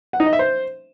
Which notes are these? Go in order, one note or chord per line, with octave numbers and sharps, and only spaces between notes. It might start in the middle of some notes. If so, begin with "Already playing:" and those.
F#5
D#4
D#5
E5
C5